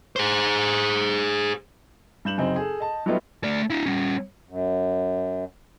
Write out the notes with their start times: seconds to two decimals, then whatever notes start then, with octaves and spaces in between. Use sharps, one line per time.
0.16 G#4 C5
2.25 G2 G6 E7 F#7
2.38 F#2 C#3 C4 D#4
2.56 G#4 A4
2.80 D#5 A5
3.06 F#3 G3 A3 B3 D#4 F4
3.44 A3 D5
3.70 D4 E4
3.86 G3 C#4
4.48 F#2